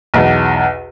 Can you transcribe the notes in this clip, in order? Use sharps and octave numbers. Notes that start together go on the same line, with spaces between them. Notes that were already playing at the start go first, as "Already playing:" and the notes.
B1 E2